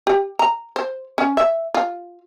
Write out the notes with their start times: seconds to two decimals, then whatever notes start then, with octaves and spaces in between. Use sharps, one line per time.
0.07 G4
0.39 A#5
0.76 C5
1.18 C#4
1.37 E5
1.74 F4